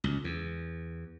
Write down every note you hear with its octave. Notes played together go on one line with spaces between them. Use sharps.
C#2
E2